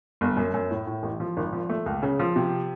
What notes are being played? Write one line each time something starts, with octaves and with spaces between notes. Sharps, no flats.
G1
F#2
F#2
A2
A2
A1
F3
G#1
F3
A3
C#2
C#3
F3
C3